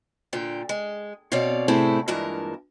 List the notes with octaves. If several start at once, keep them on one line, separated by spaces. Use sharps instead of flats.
A#2 D3 G5
G#3
B2 C4 C#5 D5 F5
A2 C3 A3 C4 E4 G#4
G2 A#2 E3 G#3 A#4 A5